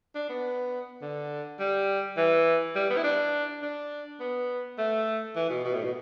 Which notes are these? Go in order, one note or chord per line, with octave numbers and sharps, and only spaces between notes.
D4
B3
D3
G3
E3
G3
B3
E4
D4
D4
B3
A3
E3
B2
B2
A2
B2